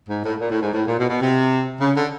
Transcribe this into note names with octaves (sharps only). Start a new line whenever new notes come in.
G#2
A2
A#2
A2
G#2
A2
A#2
B2
B2
C3
C#3
D3